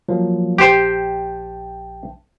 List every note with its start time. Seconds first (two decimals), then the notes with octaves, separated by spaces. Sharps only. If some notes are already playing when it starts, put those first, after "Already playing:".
0.09 F3 F#3 A#3
0.58 A#1 G4 C5 G5 A5